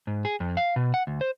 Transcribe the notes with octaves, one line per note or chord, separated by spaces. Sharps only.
G#2
G#4
F2
F5
B2
F#5
D2
C5